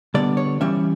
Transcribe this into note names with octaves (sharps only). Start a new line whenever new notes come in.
D3 G3 B3 D5
C#5
E3 G3 C#4 E5